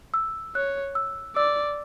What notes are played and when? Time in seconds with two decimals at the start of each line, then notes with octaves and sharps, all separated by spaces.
0.14 E6
0.55 C#5 F#6
0.95 E6
1.36 D5 E6